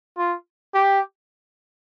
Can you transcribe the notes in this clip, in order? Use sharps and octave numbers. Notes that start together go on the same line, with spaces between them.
F4
G4